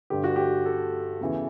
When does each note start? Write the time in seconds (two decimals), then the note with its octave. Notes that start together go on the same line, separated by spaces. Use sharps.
0.10 G2 D3 G4
0.24 F#4
0.36 G4
0.65 A4
1.21 E2 C#3 E3